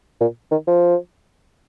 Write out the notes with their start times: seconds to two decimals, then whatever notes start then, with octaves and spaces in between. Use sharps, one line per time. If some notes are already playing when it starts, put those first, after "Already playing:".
0.21 A#2
0.52 D#3
0.67 F3